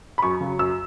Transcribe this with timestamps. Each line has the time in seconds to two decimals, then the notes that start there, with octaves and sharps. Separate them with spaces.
0.18 B5
0.22 F#2 C#6
0.40 C#3 F#3
0.59 F#2 E6